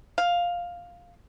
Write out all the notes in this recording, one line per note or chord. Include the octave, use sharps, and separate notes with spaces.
F5